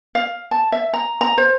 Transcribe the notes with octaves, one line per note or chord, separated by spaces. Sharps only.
F5
A5
E5
A#5
A#5
C5